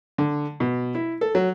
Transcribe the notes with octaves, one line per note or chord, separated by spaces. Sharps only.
D3
B2
E4
A4
F#3